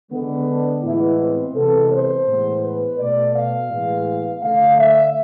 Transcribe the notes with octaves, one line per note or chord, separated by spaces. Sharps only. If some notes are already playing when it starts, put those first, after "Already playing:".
D3 G#3 B3
D4
A2 E3 G#3 B3 E4
C4
C3 E3 G#3 B3 A4
C5
A2 E3 G#3 B3
B4
B2 A3 D5
F5
A2 E3 G#3 B3
D3 A3 F5
E5